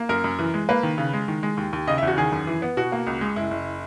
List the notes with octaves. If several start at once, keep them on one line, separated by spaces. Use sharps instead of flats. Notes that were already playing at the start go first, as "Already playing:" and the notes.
Already playing: A#3
F#2 A#4
F#2
E3
G#3
A#3 B4
D#3
C#3
G#3
D#3
G#3
D#2
D#2
C#3 D#5
E5
E2 F#4
D#3 G#4
F#2
E3
B3
B2 F#4
A#3
C#2
G#3
F#1 E4
F#1